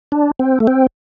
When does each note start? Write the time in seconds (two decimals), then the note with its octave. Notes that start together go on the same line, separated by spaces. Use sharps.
0.12 D4
0.39 C4
0.60 A3
0.67 C4